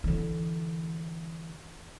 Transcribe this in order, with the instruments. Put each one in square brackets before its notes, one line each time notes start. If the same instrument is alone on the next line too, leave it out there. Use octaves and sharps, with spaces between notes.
[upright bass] D3 E3